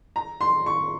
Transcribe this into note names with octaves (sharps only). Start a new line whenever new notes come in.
A#5
C6
C#6